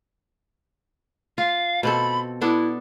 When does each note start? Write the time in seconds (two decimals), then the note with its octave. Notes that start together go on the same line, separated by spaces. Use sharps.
1.38 F4 F5
1.83 B2 C4 A4 B5
2.41 B3 D4 E4 A4